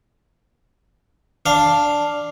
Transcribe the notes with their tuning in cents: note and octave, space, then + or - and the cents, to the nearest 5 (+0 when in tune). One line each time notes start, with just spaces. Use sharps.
D4 +0 F5 +0